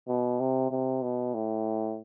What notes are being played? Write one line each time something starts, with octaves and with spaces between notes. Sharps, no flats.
B2
C3
C3
B2
A2